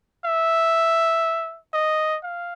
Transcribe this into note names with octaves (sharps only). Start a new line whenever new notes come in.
E5
D#5
F5